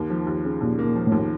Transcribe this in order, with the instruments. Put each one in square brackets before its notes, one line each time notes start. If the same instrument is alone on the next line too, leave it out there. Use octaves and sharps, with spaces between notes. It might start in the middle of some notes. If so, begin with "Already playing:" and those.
Already playing: [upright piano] D#2 A#3
F3
D#2
C#3
[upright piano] D#2 [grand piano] A#2
[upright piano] A#3
[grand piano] A#2
[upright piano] F3
[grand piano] A2
[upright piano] D#2